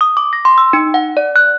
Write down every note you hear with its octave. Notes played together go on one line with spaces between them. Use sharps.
D#6
D6
A#6
C6
E6
D#4
F#5
D5
F#6